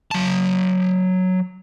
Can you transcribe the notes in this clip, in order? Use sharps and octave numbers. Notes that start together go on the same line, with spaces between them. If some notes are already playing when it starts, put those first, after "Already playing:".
F#3 A5